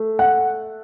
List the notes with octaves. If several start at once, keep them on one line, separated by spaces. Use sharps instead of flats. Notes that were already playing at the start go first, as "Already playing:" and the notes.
Already playing: A3
F#5